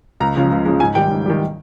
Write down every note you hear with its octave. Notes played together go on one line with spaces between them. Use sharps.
C#2 A#5
C#3 F3 G#3
C#2
C#3 F3 G#3
G#2 G#5
D#3 G3 G5
G#2
D#3 G3